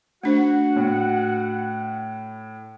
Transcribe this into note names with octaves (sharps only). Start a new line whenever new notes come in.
A3 D4 F#4 C5 F#5
A2